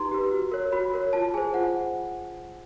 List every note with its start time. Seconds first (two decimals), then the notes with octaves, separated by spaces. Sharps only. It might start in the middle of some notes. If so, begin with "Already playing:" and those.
Already playing: D#4 G4 B4 A#5 C6
0.12 G4 B4
0.32 F#4
0.52 A#4 C#5
0.72 F#4 B5
0.94 A#4 C#5
1.13 F4 A5
1.34 G#4 C5 G#5
1.54 F4 F#5